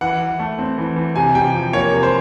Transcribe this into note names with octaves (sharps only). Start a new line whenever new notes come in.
E3 F#5
E3
A3
C4
E3
E3
C3 G#5
C3 G5
F3
A#3 C#5
C3
C5